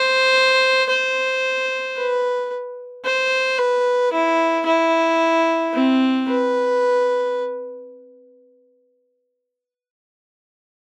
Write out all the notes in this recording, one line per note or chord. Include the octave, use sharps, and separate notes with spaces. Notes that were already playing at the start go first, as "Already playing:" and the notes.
Already playing: C5
C5
B4
C5
B4
E4
E4
C4
B4